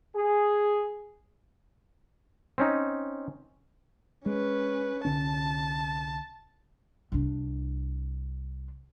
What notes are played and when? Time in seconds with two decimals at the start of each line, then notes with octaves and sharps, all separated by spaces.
0.16 G#4
2.58 C4 C#4 D#4
4.26 G#3 C#4 B4
5.05 C2 D3 C#4 A5
7.12 C2 D4